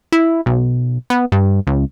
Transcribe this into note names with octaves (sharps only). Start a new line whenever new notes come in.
E4
B1
B3
G2
C#2